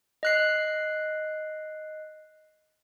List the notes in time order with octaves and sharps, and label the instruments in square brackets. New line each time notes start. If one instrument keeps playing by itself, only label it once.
[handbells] D#5 F#6 C7